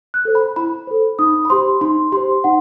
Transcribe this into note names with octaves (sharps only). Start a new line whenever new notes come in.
F#6
A4 C5
B5
E4 B5
A4 C5
D#4 D#6
B5
G4 C5 C6
D#4 C6
G4 C5 C6
D#4 F#5